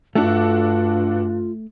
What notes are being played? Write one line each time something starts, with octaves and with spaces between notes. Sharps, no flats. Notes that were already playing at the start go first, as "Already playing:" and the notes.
G2 A3 D4 F4 F#4 A4